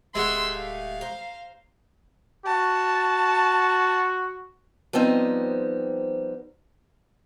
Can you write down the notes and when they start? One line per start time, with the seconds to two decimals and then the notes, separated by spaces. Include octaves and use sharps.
0.15 D1 G#3 A3 G4 G#4 F#5 C6 E6
0.55 F5
1.01 C5 A#5
2.46 F#4 A5
4.93 F3 G3 B3 C4 D#4